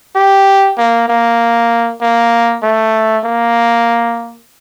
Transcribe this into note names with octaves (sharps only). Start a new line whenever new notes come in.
G4
A#3
A#3
A#3
A3
A#3